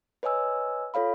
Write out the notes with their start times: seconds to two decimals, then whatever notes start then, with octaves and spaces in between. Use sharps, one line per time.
0.23 B4 C#5 D#5 G#5 E6
0.94 F4 A4 C#5 F5 B5